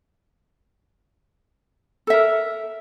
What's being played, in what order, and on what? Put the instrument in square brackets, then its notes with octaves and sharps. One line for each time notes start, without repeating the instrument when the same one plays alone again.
[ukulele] A4
E5
A#4